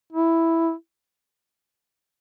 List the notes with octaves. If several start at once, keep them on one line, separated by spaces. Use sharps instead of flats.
E4